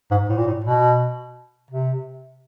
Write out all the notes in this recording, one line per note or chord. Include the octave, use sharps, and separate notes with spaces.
G#2
A2
A#2
A2
B2
C3